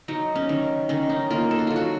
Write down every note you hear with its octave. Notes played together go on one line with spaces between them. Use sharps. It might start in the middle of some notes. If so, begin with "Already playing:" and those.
F#3 D#4
C#4
D#3
D#3 C#4
D#4
A#3 F4
A4
F#4
F#3 F4
F#4